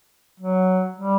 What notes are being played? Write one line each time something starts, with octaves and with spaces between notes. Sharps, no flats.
F#3
G3